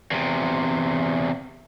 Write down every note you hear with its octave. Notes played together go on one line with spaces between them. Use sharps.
E2 C3